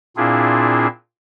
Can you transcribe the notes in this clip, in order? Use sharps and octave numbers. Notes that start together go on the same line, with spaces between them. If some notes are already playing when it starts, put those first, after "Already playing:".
A#2 C4 D4 E4 F4 G#4